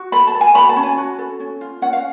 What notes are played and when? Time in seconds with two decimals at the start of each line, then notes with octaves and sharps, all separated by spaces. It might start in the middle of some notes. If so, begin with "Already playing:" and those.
Already playing: F#4
0.12 A4 B5
0.27 A5
0.34 A4
0.41 G#5
0.55 F#4 B5
0.69 A5
0.76 C#4
0.83 G#5
0.98 F#4
1.19 A4
1.40 C#4
1.61 F4
1.82 C#4 F#5
1.93 F5